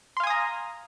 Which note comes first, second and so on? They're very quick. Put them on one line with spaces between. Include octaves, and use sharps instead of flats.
C6 F5 G#5 D#6 A#5